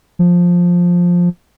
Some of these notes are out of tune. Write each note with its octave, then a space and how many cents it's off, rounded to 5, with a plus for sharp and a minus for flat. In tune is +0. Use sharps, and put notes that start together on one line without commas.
F3 +10